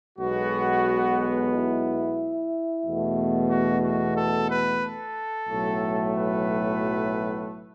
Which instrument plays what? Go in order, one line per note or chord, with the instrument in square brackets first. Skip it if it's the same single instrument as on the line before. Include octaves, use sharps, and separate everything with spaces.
[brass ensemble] B1 B2 G#3 B3 F#4
E4
E2 B2 A3
F#4
F#4
A4
B4
A4
B1 A2 F#3 A3
B4